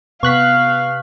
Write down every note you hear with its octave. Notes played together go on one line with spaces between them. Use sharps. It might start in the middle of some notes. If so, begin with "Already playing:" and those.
C3 B3 F5 C#6 F#6 B6